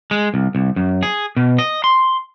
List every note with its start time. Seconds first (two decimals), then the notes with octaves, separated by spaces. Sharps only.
0.11 G#3
0.34 C2
0.55 C2
0.76 F#2
1.03 G#4
1.37 B2
1.58 D#5
1.84 C6